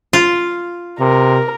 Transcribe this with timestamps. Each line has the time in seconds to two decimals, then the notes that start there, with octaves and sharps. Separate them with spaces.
0.13 F4
1.00 C3 A#4